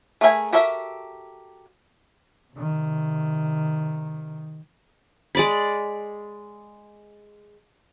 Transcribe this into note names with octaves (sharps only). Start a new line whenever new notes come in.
A3 G#4 A#4 E5 G#5
F#4 G4 A4 A#4 E5
C3 D#3
G#3 D5 B5